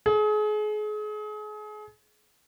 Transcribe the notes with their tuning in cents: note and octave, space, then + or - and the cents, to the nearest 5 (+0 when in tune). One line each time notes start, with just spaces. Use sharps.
G#4 +35